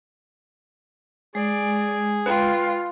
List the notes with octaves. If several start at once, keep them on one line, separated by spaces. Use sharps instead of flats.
G#3 G#4 D5
F4 B4 G5